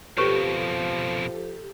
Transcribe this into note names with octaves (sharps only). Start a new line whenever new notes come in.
F2 B2 F3 G4 A4 B4 C#5 C#6